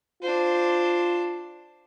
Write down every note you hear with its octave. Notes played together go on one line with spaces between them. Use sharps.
D4 F4 C5